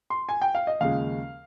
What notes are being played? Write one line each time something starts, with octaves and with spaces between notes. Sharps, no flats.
C6
G#5
G5
F5
D#5
D#2 C#3 F3 G#3 F5